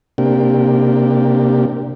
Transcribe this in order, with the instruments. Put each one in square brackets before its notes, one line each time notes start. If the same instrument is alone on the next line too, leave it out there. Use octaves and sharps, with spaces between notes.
[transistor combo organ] C3 A#3 D4 G4